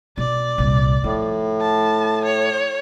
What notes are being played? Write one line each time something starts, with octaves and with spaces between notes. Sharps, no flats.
B2 D5
C2 A#2
A2 F3
A5
C#5